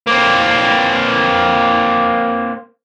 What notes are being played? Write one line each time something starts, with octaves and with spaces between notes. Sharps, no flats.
A#3 C4